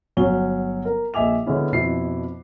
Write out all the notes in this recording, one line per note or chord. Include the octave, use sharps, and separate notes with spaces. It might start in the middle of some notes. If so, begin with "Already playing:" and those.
G1 F#3 C#4 F#4 G7
A#4
A#1 D#5 E5 G#5 D6 F7
D3 G#3 B3 C#4 E4
F2 B2 E4 C7